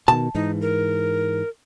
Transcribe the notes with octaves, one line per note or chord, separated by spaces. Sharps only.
B2 D#3 A5
G#2 E3 D#4
A#4